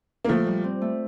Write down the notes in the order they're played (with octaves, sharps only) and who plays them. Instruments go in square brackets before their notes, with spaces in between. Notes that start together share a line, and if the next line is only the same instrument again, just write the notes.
[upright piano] A#3
[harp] A#2 [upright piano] F3 A3
[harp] G3
C4
A3